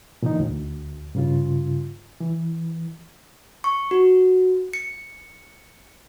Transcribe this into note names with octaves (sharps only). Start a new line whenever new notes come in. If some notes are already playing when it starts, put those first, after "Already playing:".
A#2 D3 E3 D#4
D2
G2 C#3 F4
E3
C#6
F#4
C#7